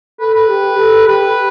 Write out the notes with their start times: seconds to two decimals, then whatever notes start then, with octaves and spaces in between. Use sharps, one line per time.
0.20 A4 B4
0.34 B4
0.49 G4
0.78 A4
1.07 G4 B4